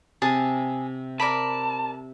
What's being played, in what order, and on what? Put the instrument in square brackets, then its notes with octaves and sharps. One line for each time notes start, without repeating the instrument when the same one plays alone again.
[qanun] C3 [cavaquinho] G#4 A5
[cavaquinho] A#4 D5 B5 [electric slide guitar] A5